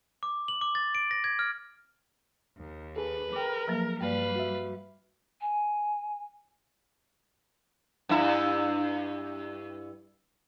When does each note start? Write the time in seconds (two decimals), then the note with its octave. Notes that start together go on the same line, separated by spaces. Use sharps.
0.23 D6
0.48 F#7
0.61 D6
0.75 A6
0.95 D7
1.11 A#6
1.24 G#6
1.39 F6
2.57 D#2
2.96 G#4 A4 B4
3.33 A#4 G5 D6
3.68 F3 F#3 A#3
4.01 G2 G3 A#3 B4 D5 F5
4.36 F#4 E5
5.40 G#5
8.09 G2 E4